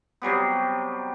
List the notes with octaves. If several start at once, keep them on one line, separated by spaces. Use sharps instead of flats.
C3 F#3 G3 B3